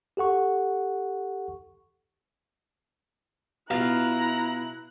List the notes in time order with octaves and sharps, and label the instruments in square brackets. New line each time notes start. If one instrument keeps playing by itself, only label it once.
[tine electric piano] G4 A4 F#5 C#6
[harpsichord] B2 F4 [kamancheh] E4 F#6 [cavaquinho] F5 [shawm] A#5